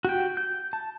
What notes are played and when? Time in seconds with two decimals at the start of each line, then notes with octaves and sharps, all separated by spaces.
0.05 F#4 G4 G5
0.37 G6
0.73 A5